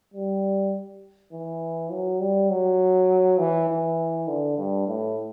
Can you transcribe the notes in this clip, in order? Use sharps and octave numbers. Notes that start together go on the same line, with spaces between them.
G3
E3
F#3
G3
F#3
E3
E3
D3
G2
A2